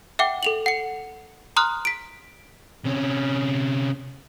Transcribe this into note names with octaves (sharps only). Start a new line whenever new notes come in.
E5 F#5 G5 D6
A4 F7 F#7
F#5 C#7
A#5 C6 D#6 F6 F#6
B6 D7
C3 C#4